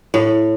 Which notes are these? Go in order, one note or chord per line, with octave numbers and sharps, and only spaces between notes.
A2